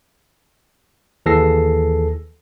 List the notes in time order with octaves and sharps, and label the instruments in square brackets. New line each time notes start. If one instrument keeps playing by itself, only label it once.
[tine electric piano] D#2 E3 G#4 A4 A#6 C7